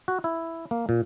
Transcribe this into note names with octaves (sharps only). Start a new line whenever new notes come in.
F#4
E4
A#3
A#2